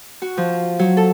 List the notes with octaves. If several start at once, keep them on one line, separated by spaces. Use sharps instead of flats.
F#4
F3
F#3
A4